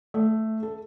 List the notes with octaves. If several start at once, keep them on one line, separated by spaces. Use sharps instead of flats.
A3
A4